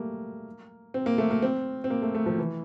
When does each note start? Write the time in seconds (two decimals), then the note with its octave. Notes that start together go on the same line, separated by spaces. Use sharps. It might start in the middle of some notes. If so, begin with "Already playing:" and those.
Already playing: G3 A3 A#3
0.94 C4
1.06 A#3
1.18 A3
1.31 A#3
1.42 C4
1.84 C4
1.90 A#3
2.02 A3
2.15 A3
2.26 F3
2.38 E3